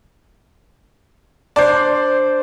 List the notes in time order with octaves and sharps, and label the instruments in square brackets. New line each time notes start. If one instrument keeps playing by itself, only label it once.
[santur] D4 C5 [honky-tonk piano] D5